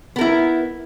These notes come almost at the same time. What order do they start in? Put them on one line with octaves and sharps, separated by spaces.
B3 A#4 E4